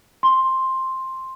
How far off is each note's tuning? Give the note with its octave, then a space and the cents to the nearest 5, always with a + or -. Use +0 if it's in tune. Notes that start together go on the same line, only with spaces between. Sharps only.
C6 +5